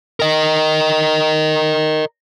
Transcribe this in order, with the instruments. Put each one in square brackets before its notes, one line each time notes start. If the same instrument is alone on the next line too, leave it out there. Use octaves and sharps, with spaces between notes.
[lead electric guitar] A#4 D#5